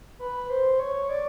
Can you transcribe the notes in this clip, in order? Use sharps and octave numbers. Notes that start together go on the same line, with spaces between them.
B4
C5
C#5
D5